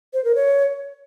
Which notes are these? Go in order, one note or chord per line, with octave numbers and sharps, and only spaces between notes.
C5
A#4
C#5